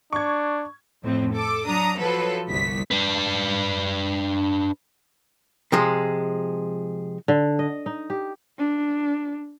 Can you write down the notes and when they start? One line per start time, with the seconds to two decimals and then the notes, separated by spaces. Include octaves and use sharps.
0.13 D4 C#6 G#6
1.02 F2 A2 C4
1.35 A4 D6
1.67 F#3 D4 A#5 D#6
1.99 F3 F#3 A4 B4
2.48 G1 C2 B6
2.91 D4 B4
5.72 C3 F3 G#3
7.28 D3
7.59 D#5
7.86 D#4
8.10 G4
8.58 D4